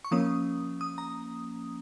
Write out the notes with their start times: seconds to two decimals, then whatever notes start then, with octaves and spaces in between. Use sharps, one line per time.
0.05 C#6
0.11 F3 A#3 C#4 D#6
0.81 D#6
0.98 A#5